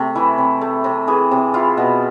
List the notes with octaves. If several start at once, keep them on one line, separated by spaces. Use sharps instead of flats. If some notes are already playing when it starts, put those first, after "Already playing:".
Already playing: C3 A3
E3 E4
C3
A3
C3
E3 G#4
C3
E4 F4
B2